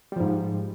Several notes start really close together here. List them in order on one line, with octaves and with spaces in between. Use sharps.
G3 F3 G#2